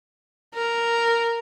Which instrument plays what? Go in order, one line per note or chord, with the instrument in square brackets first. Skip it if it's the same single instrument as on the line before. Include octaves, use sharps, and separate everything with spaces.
[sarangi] A#4